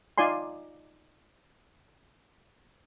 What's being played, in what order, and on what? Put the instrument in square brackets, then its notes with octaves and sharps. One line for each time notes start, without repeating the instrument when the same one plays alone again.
[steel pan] D#4 F4 D5 G#5 C6